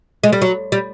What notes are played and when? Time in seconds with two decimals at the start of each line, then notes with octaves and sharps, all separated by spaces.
0.24 G#3
0.32 G3
0.42 F#3
0.72 G3